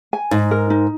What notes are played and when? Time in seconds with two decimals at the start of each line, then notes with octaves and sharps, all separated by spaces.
0.13 G#5
0.31 G#2 D#4
0.51 A#4
0.70 D#4